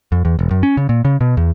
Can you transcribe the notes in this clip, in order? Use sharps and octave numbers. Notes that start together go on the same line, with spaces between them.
F2
E2
E1
F#2
C#4
C#3
A#2
C#3
B2
E2